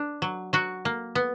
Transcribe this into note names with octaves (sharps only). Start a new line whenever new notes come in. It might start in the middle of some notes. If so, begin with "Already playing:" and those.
Already playing: D4
F#3
F#3 F#4
A#3
B3